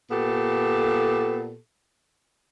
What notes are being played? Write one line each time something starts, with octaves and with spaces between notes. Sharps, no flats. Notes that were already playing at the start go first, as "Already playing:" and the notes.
A#2 B3 G4 A4